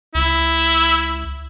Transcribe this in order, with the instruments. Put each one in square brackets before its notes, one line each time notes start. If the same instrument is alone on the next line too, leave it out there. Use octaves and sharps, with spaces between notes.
[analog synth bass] C#2 [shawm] E4